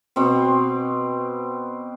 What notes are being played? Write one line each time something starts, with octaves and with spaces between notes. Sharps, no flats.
B2 C4